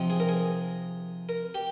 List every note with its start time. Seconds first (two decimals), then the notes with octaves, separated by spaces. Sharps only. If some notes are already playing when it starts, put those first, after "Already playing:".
Already playing: C3 F3 C4 D#4
0.10 G#4
0.20 A#4
0.29 G#4
1.29 A#4
1.54 G4